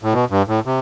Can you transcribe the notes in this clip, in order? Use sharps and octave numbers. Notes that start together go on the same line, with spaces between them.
A2
B2
G2
A2
C3